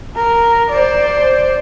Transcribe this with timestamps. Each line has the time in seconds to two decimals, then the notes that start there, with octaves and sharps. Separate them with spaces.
0.16 A#4
0.70 C5 D5